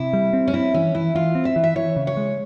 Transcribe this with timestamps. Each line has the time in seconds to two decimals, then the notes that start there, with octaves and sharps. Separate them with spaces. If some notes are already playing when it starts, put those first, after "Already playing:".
Already playing: C3 E4
0.13 G3
0.33 C4
0.47 C#4
0.53 C4 E4
0.74 E3 C#4
0.95 E3 E4
1.15 E3 F4
1.35 C4
1.45 E5
1.56 E3
1.64 E5
1.76 E3 C#5
1.96 C#3
2.07 C#5
2.17 G#3